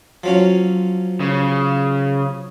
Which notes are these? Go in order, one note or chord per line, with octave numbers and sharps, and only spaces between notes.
F3 F#3 C#4
C#3